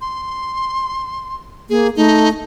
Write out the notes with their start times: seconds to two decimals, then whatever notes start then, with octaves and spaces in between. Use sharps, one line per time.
0.01 C6
1.70 A#3 G#4
1.96 A3 D#4